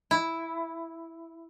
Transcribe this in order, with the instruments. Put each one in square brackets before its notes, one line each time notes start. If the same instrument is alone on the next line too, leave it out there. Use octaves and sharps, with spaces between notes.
[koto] E4